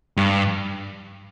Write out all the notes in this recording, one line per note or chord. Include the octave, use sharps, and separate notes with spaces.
G2